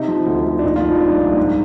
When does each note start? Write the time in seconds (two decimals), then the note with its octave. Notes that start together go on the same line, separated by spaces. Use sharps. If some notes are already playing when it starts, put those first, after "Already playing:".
Already playing: C3 D#4
0.08 F3
0.26 D2
0.45 D2
0.59 D4
0.63 A#2 D#4
0.76 F4
0.82 F3
0.88 D#4
1.00 C2 D4
1.19 C2
1.37 G#2